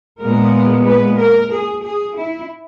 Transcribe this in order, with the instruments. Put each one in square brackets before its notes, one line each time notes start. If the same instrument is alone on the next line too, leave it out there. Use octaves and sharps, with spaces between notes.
[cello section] A#2 G#3 B3 A#4
B4
A#4
G#4
G#4
E4